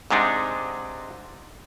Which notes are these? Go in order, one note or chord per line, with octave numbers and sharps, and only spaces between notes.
G#2 C3 G#3 D4 D#4